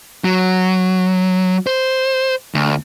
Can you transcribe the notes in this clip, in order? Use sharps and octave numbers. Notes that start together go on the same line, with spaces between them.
F#3
C5
D2